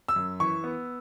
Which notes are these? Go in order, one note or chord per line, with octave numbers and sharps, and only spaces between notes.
E6
F#2
E3 C#6
B3